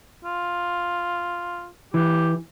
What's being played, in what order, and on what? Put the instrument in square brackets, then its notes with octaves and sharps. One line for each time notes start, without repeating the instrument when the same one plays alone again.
[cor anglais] F4
[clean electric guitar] E3 [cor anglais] G4